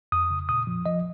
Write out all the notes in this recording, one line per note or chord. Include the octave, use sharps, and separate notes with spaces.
F2 D#6
C#3
A#2 D#6
F3
F3 D#5